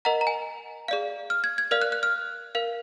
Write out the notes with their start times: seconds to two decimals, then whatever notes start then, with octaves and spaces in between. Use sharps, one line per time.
0.05 A#4 D#5 F#5 A#5
0.21 A#5
0.27 G#5
0.88 G#4 D5 F5
1.30 F6
1.44 G#6
1.58 G#6
1.71 A#4 D5 F5 F6
1.82 F#6
1.92 F#6
2.03 F6
2.55 A#4 F5